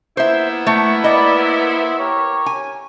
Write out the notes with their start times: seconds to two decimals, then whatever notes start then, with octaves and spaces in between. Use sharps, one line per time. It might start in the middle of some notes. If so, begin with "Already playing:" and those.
0.17 A#3 B3 E4 C5 E5
0.67 A3 D4 C#6
1.04 D5 D#5 B5
1.41 C5 E5
1.99 G4 A#4 C#5
2.46 G#5